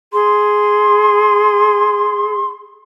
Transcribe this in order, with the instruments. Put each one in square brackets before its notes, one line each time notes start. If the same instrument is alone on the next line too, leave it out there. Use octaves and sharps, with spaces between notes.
[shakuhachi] G#4 [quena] C6